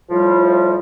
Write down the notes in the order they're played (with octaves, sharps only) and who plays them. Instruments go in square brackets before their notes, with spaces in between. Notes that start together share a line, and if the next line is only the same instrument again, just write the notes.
[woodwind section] A2 F3 G3